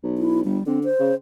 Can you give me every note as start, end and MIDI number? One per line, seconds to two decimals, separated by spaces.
0.03 0.42 35
0.18 0.40 64
0.44 0.58 31
0.44 0.63 55
0.66 0.87 50
0.66 0.79 60
0.84 1.14 72
0.99 1.12 49